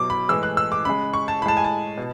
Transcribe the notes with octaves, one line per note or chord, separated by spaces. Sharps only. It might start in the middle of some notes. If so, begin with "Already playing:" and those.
Already playing: B2 F#3 D6
B5
A2 E3 G#3 E6
F#6
E6
D6
C#3 G#3 B5
C#6
A5
A2 G#3 A5 B5
G#5
A5
B2